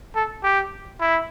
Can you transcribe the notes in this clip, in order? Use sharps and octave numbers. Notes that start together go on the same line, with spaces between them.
A4
G4
E4